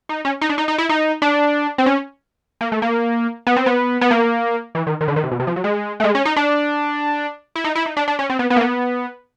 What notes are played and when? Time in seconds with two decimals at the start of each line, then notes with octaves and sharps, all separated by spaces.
0.09 D#4
0.25 C#4
0.41 D#4
0.49 D4
0.58 D#4
0.68 D#4
0.78 E4
0.89 D#4
1.22 D4
1.78 C4
1.86 C#4
2.61 A#3
2.72 A3
2.82 A#3
3.47 B3
3.56 C4
3.66 B3
4.01 B3
4.11 A#3
4.75 E3
4.87 D#3
5.01 D#3
5.08 D3
5.16 D#3
5.24 C3
5.31 B2
5.40 C3
5.47 F3
5.56 F#3
5.64 G#3
6.00 A3
6.04 G#3
6.15 C#4
6.25 D#4
6.36 D4
7.55 E4
7.64 D#4
7.75 E4
7.86 D#4
7.97 D4
8.08 D4
8.19 C#4
8.30 C4
8.39 B3
8.50 B3
8.56 A#3
8.61 B3